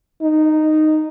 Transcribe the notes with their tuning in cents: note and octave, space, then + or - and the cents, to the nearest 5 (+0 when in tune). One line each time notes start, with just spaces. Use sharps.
D#4 -10